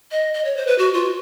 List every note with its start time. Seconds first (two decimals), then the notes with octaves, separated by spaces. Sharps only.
0.11 D#5
0.34 D#5
0.45 C#5
0.57 C5
0.67 B4
0.78 F#4
0.94 F4